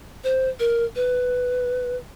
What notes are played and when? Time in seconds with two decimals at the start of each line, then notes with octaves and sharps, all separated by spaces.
0.24 C5
0.60 A#4
0.96 B4